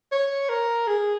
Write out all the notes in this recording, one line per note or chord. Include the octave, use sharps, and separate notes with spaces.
C#5
A#4
G#4